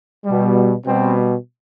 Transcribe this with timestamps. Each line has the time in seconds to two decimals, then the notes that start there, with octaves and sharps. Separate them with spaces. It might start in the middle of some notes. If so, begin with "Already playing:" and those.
0.25 B2 G3
0.86 B2 G3 C4